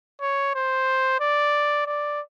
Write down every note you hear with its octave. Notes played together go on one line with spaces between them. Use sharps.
C#5
C5
D5
D5